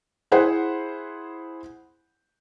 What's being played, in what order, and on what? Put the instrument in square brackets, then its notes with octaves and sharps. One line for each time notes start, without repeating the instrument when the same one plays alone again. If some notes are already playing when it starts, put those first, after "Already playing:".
[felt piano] E4 G#4 C5 F#5